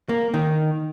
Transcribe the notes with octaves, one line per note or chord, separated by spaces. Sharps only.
A#3
D#3